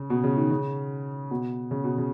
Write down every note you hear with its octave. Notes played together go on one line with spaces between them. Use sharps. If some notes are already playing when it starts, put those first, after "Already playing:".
Already playing: C#3
B2
C#3
D#3
C#3
B2
C#3
B2
C#3